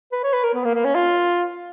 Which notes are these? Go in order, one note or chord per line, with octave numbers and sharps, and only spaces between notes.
B4
C#5
B4
A#4
B3
A#3
A#3
C#4
F4